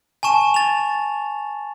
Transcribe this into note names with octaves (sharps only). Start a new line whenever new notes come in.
G#5 A5 C#6 E7
A6 F7